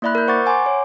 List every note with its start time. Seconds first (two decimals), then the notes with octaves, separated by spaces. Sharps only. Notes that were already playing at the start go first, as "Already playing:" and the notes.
0.02 A#3 E4 D5 E5 B5 F#6
0.15 A#4 G6
0.27 C5 F#5 C#6 D6 A6
0.46 F#5 G#5 A#5 C6 D6
0.66 C#5